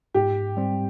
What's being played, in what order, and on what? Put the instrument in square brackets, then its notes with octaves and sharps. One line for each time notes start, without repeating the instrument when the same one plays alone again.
[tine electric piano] G#2 [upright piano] G4
[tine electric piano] G3 C4